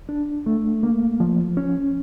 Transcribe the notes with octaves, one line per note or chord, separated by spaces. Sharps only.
D4
A3
A#3
F3
C#4